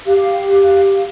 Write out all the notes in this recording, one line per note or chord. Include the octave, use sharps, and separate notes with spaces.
G4 F5